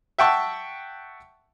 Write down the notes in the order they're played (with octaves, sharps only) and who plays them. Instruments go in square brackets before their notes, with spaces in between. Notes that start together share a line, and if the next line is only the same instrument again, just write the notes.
[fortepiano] E5 F#5 G5 A5 C#6